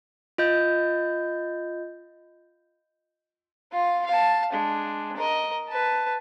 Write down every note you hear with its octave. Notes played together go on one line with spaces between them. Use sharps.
F4 D#5 G6
F4 F5
F5 A5
G#3 D4
A#4 D#5
B4 A5